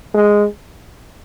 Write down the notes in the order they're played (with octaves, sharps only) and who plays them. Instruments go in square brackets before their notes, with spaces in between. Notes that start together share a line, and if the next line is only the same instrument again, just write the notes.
[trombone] G#3